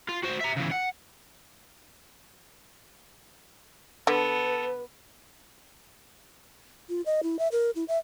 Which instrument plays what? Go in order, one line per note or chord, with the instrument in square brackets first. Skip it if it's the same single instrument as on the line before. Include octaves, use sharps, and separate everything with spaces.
[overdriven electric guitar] F4
F#4 C5
E5 A#5
C#3 E3
F#5
[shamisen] D3 [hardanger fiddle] B3 [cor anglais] A4 [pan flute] B4
[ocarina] F4
D#5
E4
E5
A#4
E4
E5